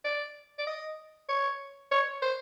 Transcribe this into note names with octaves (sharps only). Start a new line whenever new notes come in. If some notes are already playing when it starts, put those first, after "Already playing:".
D5
D5
D#5
C#5
C#5
C5